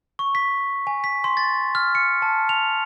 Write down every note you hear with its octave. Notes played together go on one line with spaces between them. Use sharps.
C#6
B6
G#5
B6
C6
A6
F6
C#7
A5
F7